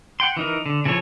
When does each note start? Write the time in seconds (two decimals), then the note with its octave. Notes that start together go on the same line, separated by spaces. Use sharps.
0.20 F#5 G5 C6
0.37 E3 D#4 A#4
0.66 D3
0.85 C#3 E3 F3 A4 C#5